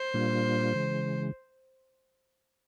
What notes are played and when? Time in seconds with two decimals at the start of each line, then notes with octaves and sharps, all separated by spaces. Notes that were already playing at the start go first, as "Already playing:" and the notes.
Already playing: C5
0.14 A#2 G3 A#3 D4 F4
0.74 C#3 E3 G#3